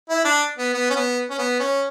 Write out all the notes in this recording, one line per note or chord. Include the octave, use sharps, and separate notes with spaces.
E4
D4
B3
B3
C#4
B3
C#4
B3
C#4